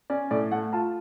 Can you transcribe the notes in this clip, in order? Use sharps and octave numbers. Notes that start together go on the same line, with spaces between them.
C#4 D5
A2 D5
A3 F#5
F4 A5